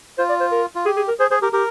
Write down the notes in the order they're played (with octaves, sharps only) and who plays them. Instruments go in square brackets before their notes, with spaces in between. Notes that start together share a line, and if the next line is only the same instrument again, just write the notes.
[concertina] F4 [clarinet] C5
[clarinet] D5
C5
A#4
[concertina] F4
[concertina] G4 [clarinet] G#4
[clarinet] G#4
A#4
[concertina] G#4 [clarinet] C5
[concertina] G#4 [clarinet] C5
[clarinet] G4 [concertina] A#4
[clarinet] G4 [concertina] A#4